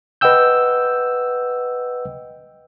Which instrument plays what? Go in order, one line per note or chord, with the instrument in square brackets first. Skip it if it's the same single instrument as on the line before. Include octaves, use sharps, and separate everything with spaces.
[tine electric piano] B4 D#5 F#5 G5 E6 G6